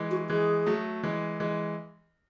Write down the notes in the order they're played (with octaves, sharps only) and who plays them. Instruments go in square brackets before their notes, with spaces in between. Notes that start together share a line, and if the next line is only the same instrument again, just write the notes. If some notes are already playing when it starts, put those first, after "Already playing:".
Already playing: [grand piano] E3 G#3
[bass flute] F#4
[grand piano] E3 G#3 [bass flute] G#4
[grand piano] F#3 A3
E3 G#3
E3 G#3